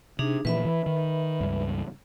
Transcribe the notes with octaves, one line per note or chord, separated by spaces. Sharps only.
C3 D4 D#4 G#4
A#2 E3 F3 B4 E5 B5
E3
D#3
C#2 G2